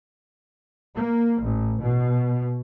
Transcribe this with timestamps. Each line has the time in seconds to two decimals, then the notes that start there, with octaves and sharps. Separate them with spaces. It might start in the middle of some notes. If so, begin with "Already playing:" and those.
0.95 A#3
1.41 A1
1.81 B2